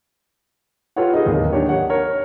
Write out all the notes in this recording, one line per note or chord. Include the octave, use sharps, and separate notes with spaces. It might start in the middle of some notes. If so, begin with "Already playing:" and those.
F4 G4 A4 B4 C#5 F#5
D#4 G#4 D#5
D1 D#2 D#3
D4 D#4 G4 C#5
C#5 F#5
A#4 C#5